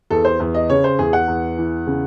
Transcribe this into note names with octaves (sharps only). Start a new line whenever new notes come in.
E2 A4
C5
E2
D#5
C#3 C#5
C5
E2 G#4
F#5
E2
E3
C#3